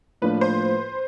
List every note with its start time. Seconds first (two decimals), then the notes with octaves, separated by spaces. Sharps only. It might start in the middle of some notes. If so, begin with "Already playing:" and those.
0.22 A2 F3 A#3 D4 F4 B4
0.41 C5